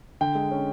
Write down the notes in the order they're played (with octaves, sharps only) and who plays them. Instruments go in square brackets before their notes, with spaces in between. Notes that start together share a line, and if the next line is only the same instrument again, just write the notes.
[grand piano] D3 G5
G#3
C#4